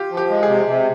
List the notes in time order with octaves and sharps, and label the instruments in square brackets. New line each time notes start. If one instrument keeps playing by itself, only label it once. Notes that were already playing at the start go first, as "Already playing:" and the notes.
Already playing: [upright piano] F4 G4
[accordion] F3
[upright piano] G4
[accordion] G#3
[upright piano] G#4
[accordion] C3
C3